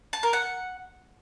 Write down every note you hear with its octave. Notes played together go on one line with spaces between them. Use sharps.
A5
A#4
F#5